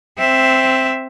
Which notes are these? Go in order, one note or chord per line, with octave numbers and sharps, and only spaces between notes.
C4 E5